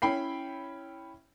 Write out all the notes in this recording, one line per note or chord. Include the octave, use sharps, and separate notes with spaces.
C#4 E4 G5 B5 C7